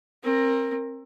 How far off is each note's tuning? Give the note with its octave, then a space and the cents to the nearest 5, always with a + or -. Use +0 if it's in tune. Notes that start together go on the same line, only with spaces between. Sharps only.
C4 +30 A#4 +0